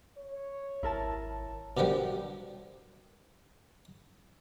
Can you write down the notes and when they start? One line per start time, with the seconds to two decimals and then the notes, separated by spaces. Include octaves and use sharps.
0.17 C#5
0.83 G#1 E4 A#4 A5
1.77 B2 D3 D#3 F3 G3